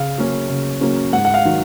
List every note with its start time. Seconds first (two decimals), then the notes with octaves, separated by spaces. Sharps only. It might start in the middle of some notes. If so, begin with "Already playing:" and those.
Already playing: C#3 F5
0.18 F#3 A#3 C#4
0.49 C#3
0.81 F#3 A#3 C#4
1.13 G#2 F#5
1.25 F#5
1.34 F5
1.45 D#3 F#3